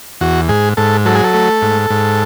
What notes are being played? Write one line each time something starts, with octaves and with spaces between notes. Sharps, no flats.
E2 F#4
G#2 G#4
G#2 A4
F#3 A4
G#4
A4
A3
G#2
G#2